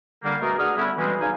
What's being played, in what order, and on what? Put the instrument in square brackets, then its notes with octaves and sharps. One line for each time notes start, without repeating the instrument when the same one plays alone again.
[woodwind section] D3 G3 A#3
B2 A3 F#4 G#4 A#4
D4 G#4 F#5 D#6 F6
D3 G3 B3 C#4 D4 E4
B2 E3 G3 G#3 C4 C#4
C#3 D#4 D5 F5 G#5